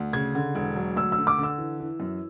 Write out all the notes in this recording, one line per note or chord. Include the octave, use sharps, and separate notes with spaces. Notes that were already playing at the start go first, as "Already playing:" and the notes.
Already playing: D2
C#3 G#6
D3
E1
F#3
D2 E6
E6
D3
D6
D3
E6
E3
E3
F#2